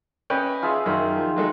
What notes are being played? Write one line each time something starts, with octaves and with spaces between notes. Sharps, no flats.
C#4 B4 D#5 G5
F4 G#4 E5
F#2 D#3
F3
F#3 G#3 A4